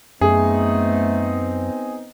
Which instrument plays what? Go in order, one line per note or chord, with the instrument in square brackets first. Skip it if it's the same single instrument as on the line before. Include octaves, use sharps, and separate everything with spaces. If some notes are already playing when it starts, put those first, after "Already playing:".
[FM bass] F#2 [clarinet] A3 [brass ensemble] B3 C4 D#4 [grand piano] G#4